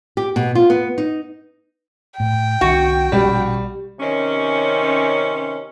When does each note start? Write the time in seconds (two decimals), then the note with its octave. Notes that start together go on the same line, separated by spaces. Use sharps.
0.17 G4
0.36 B2
0.55 F4
0.70 B3
0.98 D#4
2.20 A2 G5
2.61 C2 D#3 F#4
3.12 A#1 B2 G3 C#4
4.00 C3 D#3 C#4